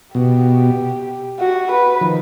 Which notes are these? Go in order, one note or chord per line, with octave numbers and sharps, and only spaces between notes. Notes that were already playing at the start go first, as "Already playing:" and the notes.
B2 G4
F#4
B4
D#3 F3